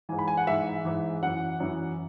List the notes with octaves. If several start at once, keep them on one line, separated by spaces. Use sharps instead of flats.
G#2 E3 G#5
B5
G#5
F#5
G#2 E3 E5
G#2 E3
F#2 E3 F#5
F#2 E3